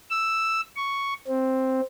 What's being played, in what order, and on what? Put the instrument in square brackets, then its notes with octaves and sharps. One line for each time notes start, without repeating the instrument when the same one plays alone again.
[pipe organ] E6
C#6
C4